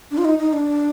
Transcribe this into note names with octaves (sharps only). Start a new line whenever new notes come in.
D4
F4
D#4
D#4
D4